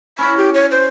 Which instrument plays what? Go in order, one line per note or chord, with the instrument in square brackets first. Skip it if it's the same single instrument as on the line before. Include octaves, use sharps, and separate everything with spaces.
[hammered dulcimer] C#4 E4 F#4 [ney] B5
[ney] G4
C#5
C5